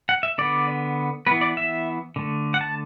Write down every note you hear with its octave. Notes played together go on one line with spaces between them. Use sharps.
F#5
E5
D3 B3 D5
E3 B3 B4
D5
E5
D3 A3
F#5
A5